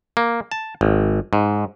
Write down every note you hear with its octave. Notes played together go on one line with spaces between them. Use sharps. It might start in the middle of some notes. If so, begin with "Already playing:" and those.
A#3
A5
G#1
G#2